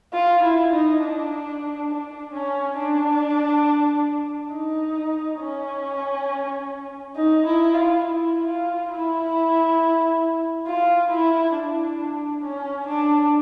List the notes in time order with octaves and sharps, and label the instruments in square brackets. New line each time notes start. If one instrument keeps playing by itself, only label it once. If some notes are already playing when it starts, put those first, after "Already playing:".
[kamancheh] F4
E4
D#4
D4
D4
C#4
D4
D#4
C#4
D#4
E4
F4
E4
F4
E4
F4
E4
D4
C#4
D4